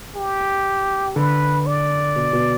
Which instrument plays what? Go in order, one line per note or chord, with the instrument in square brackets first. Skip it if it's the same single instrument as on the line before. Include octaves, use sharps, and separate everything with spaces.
[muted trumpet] G4
[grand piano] D3 [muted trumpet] B4
[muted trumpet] D5
[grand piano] B2
B2